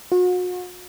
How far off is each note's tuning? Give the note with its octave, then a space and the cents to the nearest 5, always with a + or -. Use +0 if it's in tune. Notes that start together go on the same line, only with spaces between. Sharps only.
F#4 -40